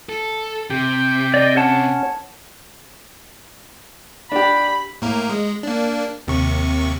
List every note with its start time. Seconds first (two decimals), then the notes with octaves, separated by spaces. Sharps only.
0.09 A4
0.70 C3 G4 G5
1.34 D5 D#5
1.56 C#4 C#5 F#5 A5
4.32 D4 G4 B5
5.02 A2 A#3 A#4
5.29 G#3
5.63 A#3 D4
6.27 D#2 C3 C#6